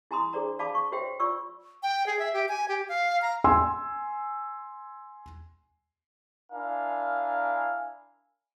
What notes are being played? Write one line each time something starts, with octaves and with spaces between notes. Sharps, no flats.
E4 G#5 A#5 C6 D#6
D4 G#4 C5 D5 A#5
D5 F5 A5 B5 D6
C#6
F#4 C5 C#5 E5 G5
F4 D5 C#6 E6
G5
G#4
E5
G4
G#5
G4
F5
A#5
G#5 C6 E6
D4 E4 A#4 F5 G#5